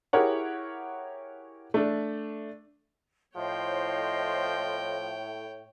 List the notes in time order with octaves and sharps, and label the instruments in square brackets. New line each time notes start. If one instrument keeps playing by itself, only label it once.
[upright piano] E4 G4 G#4 A#4 C#5 F#5
A3 D4
[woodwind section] A2 [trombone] F3 [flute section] C5 D#5 C6 [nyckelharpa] C#5 G5